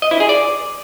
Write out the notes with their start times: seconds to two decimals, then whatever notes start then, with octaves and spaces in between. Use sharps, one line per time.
0.02 D#5
0.11 E4
0.20 G#4
0.29 D5